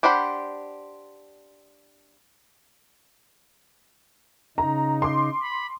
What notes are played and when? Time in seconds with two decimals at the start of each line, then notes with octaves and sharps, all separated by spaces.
0.03 D4 G4 C5 F#5 B5
4.58 C#3 D#4 A#5
5.02 C6 D6
5.42 B5